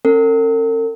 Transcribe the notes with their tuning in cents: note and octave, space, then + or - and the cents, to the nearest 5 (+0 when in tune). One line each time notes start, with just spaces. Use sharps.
C#4 -40 A#4 -45